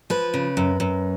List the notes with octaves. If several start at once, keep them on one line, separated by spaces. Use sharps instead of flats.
F3 B4
C#3
F#2
F#2